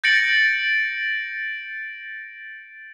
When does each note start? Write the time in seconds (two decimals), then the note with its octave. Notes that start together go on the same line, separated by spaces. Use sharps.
0.04 G6 A6 A#6 C#7 D7 F#7